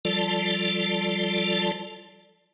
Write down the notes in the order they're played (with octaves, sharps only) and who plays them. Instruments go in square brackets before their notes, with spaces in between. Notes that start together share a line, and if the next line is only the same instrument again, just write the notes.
[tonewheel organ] F3 G3 F4 A4 D5 A5